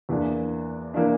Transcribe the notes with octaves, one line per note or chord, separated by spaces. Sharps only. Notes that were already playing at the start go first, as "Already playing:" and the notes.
E2 E3 A#3 D4
E3 A#3 D4